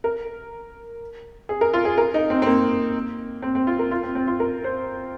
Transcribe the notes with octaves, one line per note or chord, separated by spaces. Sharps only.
A#4
G#4
A#4
F4
G#4
A#4
D#4
C4
C4
A#3
C4
C4
F4
A#4
F4
C4
C4
F4
A#4
C5